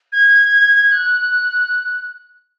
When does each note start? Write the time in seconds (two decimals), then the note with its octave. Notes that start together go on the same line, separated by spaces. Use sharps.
0.12 G#6
0.92 F#6